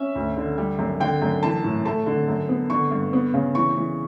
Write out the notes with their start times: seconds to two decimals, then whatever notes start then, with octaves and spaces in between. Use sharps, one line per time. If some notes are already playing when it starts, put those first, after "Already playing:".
Already playing: C#4 E5
0.15 D2
0.37 D3
0.58 G3
0.79 F#2
1.00 D3 G5
1.22 F#2
1.43 E3 A5
1.64 A2
1.85 A3 A5
2.06 D3
2.28 F#2
2.49 B3
2.70 D3 C#6
2.91 G2
3.13 B3
3.34 C#3
3.55 E3 C#6
3.76 E3